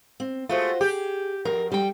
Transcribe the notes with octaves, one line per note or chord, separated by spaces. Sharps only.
C4
G#3 A3 F4 F#4 C5
G4 G#4
F2 A#4
G3 G5